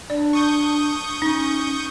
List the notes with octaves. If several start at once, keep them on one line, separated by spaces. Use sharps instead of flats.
D4 D5
C#6 D#6 G6
C#4 D#4